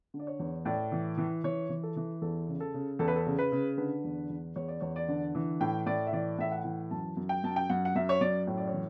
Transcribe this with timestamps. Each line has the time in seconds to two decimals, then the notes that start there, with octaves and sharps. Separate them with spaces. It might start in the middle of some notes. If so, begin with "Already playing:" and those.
0.14 D3
0.19 D5
0.27 C#5
0.40 E2
0.65 A2 D5
0.92 E3
1.18 E3
1.44 E3 C#5
1.69 E3
1.83 A4
1.96 E3
2.22 E2 A4
2.48 C#3
2.60 A4
2.74 C#3
2.99 E2 A4
3.08 B4
3.16 A4
3.26 C#3
3.39 B4
3.52 C#3
3.78 D3 B4
4.04 E2
4.30 E2
4.56 E2 C#5
4.68 D5
4.81 E2 C#5
4.96 D5
5.08 D3
5.35 E3
5.60 A2 G5
5.86 A2 D5
6.07 E5
6.13 E3 D5
6.38 A2 E5
6.52 F#5
6.64 E3
6.91 F#2 A5
7.17 F#2
7.29 G5
7.44 F#2 A5
7.56 G5
7.70 F#2 F#5
7.85 F#5
7.95 F#2 E5
8.09 C#5
8.21 F#2 D5
8.47 A2 C#5
8.57 D5
8.67 C#5
8.73 E3